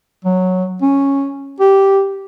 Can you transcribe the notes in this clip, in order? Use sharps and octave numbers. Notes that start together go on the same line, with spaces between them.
F#3
C#4
G4